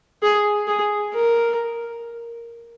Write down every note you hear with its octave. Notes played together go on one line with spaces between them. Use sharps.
G#4
G#4
A#4